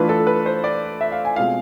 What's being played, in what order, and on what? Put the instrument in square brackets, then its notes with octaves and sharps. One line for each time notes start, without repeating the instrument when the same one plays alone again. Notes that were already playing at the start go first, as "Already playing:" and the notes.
Already playing: [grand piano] E3 A3 D4 F4 B4
A4
B4
C5
D5
E5
F5
G#5
B2 G#3 C4 F4 F5